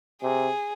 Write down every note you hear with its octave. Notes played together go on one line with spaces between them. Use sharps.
C3 G#4